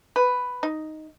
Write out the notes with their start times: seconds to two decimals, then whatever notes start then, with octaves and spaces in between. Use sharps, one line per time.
0.16 B4
0.63 D#4